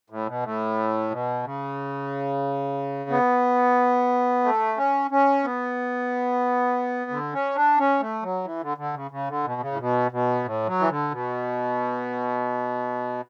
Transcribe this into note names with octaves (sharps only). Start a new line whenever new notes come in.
A2
B2
A2
B2
C#3
B3
A3
C#4
C#4
B3
D3
C#4
D4
C#4
A3
F#3
E3
D3
D3
C#3
C#3
D3
B2
C#3
A2
B2
B2
A2
F#3
E3
D3
B2